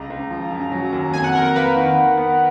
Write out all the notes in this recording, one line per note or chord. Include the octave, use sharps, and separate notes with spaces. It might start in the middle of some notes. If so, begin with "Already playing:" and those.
Already playing: C#2 A#5
C#2
F3
F#2
F#3
D#2
F2 G#5
F#5
F2 A#4
A#4
A#3 B4
D#3
D#3
B3